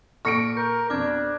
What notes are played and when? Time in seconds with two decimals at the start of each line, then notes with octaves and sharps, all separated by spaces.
0.25 A#2 A4 C#6 F6 A#6 C#7 D7
0.57 A#4 G6
0.90 F2 B2 D4 D6 F6 G#6